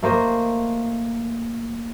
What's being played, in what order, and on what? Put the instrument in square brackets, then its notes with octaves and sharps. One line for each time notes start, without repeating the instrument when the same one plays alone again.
[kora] A3 A#3 C5 D#5